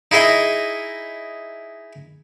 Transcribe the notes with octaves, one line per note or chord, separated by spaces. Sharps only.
D#4 E4 G#4 D#5